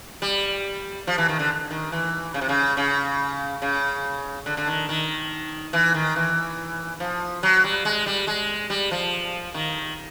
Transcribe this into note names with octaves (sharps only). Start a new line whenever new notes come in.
G3
F3
E3
D#3
D3
D#3
E3
C#3
C3
C#3
C#3
C#3
D3
D3
D#3
D#3
E3
D#3
E3
F3
F#3
G3
G#3
G3
G#3
G3
F3
D#3